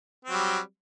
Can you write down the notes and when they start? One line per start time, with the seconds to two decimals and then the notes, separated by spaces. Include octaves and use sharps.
0.25 C4
0.29 F#3
0.34 G3